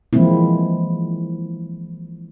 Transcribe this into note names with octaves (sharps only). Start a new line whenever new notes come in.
E3 F3 G#3 A#3 C4 E4